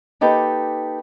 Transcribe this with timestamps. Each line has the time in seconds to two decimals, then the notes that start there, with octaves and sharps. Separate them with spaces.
0.21 A#3 D#4 G4 A4 B4